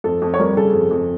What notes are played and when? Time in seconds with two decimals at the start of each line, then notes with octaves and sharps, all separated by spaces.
0.04 F2 A4
0.22 F2
0.34 C#5
0.39 G3 A#4
0.57 C#3 A4
0.73 F2
0.91 F2